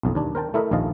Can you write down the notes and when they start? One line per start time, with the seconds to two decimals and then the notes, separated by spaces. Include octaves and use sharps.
0.03 B1 F2
0.15 D#2 D4
0.35 A#4 C5 G5 A5
0.54 A3 E4 A#4 D#5 E5
0.71 A#1 D#2 F3 D#5 F5 A5